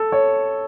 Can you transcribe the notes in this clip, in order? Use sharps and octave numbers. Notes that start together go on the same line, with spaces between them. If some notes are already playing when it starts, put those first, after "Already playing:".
Already playing: A4
C#5